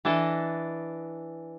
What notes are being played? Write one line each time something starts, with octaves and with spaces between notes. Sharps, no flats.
E3 D4 A4 D#5